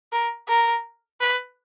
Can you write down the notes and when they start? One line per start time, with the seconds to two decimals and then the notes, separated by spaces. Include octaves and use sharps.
0.12 A#4
0.48 A#4
1.20 B4